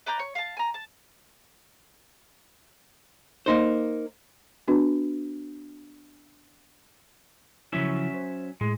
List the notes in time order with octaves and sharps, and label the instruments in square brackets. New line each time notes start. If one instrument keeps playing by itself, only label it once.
[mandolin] B4 D5 A#5 G6
C#5
F5 A5
G#5 A#5
A5
[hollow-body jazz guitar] A#3 D#4 C5
[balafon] B3 D4 F#4 B4
[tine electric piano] C#3 F3 E4 [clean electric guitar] F#3 C#4 E5
[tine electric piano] C5
[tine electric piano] A2 [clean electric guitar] G#3